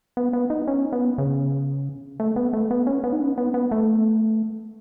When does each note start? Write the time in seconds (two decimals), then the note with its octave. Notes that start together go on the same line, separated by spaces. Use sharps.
0.17 B3
0.33 B3
0.50 D#4
0.68 C#4
0.93 B3
1.18 C#3
2.20 A3
2.36 B3
2.53 A3
2.71 B3
2.87 C#4
3.04 B3
3.13 D#4
3.21 C#4
3.38 B3
3.54 B3
3.71 A3